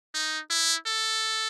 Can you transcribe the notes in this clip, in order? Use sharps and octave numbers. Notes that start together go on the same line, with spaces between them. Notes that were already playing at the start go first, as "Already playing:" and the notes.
D#4
E4
A4